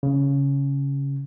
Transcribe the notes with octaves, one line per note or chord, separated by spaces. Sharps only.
C#3